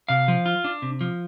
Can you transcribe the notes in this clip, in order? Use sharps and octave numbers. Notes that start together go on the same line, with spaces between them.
C3 F5
F3
F4
D4
C3
F3